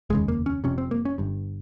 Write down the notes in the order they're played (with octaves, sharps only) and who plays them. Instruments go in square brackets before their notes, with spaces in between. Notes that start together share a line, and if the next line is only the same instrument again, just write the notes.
[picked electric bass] F1 D#2 C#3 G#3
A#3
C#4
F1 F2 C3 C#4
C4
A#3
C#4
G1 G2